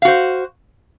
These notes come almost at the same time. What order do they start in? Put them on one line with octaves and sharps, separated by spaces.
F5 F#4 C5